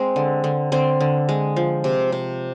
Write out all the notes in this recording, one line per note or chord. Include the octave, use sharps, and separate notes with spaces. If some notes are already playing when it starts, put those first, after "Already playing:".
Already playing: G#3 C4
D3
D3
D3 C4
D3
G#3
F3
C3
C3